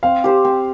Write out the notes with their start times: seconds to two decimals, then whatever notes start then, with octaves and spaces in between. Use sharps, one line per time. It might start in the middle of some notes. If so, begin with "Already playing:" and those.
0.03 C4 F5
0.24 G4 C5
0.45 C4